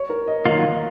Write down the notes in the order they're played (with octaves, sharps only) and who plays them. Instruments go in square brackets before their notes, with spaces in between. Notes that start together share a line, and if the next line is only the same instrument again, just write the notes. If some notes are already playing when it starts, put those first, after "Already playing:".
Already playing: [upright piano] C#5
A#4
D#5
[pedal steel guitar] D#3 F#3 A#3 F4 [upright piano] D#5
[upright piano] F5
D#5